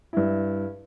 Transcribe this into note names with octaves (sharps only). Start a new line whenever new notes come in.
G2 E4